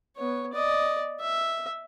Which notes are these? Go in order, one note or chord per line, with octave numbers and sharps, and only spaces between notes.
B3 C#5
D5 D#5
E5